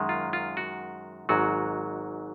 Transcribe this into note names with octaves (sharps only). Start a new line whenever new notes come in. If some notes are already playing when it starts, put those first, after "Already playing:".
Already playing: F#2 D#3 G#3
F4
F4
F#4
G#1 G#2 F#3 F#4